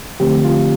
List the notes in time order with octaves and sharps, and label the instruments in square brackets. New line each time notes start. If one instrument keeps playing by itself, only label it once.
[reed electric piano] D3 F3 A3 C4 G4
F4